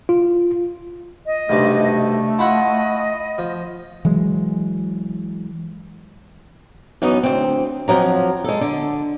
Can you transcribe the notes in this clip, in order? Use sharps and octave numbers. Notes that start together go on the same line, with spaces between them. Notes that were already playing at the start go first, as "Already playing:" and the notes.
F4
D#5
B1 G2 C3 A3
E4 F4 D#5 F#5
F3
E3 F#3 G#3
F#2 E3 B3 C#4 D#4
D2 G#2 C4
F2 F3 F#3 A#5
G#3 A4
D3